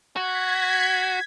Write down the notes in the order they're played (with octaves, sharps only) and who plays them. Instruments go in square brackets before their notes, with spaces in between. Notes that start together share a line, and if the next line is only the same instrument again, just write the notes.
[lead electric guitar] F#4 [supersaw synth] G#6 B6